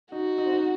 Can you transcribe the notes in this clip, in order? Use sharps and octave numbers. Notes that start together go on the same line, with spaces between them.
D#4 F#4
D#4
C4
D#4